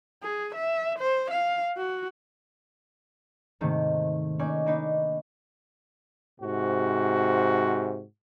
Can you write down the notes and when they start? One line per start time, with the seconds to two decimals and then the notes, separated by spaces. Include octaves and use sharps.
0.23 G#4
0.55 E5
0.99 C5
1.31 F5
1.77 F#4
3.61 G#2 C3 D#3 A3 A#3
4.39 A#3 C#4 D#4 D5 G#5
4.66 A#3 D4 D#4 B4
6.41 G#2 C3 F#4